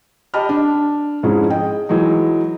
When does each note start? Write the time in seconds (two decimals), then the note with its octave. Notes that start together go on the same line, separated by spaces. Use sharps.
0.34 G4 D#5 A5 B5 F6
0.49 D4
1.23 F2 G#2 G#3 C#4 E4
1.50 G#4 D#5 G5
1.89 E3 F#3 G#3 D#4